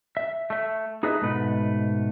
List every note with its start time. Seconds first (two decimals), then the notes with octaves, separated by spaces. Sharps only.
0.17 E5
0.50 A3 E5
1.03 D#4 G#4 A4 B4 D#5 E5
1.22 G#2 B2 A3 B4